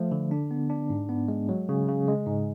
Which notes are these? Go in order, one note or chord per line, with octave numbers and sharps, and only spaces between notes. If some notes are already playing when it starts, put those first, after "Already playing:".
Already playing: F3 A3
D3
D4
B3
D4
G#2
B3
G#3
F#3
C#3
C#3
G#3
G#2